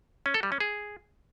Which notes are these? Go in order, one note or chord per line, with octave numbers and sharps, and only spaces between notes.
C#4
A4
G3
C#4
G#4